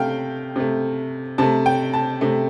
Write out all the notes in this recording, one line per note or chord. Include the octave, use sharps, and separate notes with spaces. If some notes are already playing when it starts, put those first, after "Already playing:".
Already playing: C3 A3 F5 G5
C3 A3
C3 A3 A5
G5
A5
C3 A3